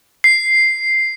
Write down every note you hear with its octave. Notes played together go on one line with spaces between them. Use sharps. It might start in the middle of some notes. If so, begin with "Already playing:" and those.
C7